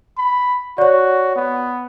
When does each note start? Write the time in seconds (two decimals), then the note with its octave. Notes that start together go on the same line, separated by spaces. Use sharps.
0.18 B5
0.78 F#4 C#5 D5
1.36 B3